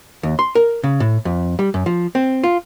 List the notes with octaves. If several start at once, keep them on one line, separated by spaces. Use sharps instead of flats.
D#2
C6
A#4
C#3
A2
F2
G3
F#2
F3
C4
F4